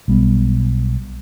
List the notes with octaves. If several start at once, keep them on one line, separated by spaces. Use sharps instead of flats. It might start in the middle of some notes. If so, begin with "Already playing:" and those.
B1 G3 B3